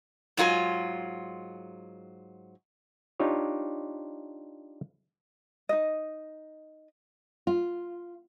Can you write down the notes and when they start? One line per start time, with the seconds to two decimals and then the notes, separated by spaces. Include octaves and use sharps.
0.37 G#2 F#3 F4 A4 G#5
3.20 D4 D#4 F4 G4 C#5
5.69 D#4 D#5
7.47 F4